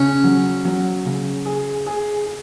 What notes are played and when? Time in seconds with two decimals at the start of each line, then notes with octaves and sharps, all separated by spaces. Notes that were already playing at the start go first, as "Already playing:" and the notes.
Already playing: C#3 C#4
0.24 F#3
0.65 F#3
1.06 C#3
1.45 G#4
1.86 G#4
2.26 G#4